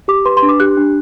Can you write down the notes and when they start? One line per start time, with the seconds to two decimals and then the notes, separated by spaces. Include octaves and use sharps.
0.08 G4 D6
0.25 B4 C6
0.37 C6
0.43 D4
0.49 D6
0.60 G4 F#6
0.77 D4